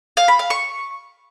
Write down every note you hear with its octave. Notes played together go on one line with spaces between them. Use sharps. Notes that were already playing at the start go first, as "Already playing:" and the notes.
F5
B5
F5
C#6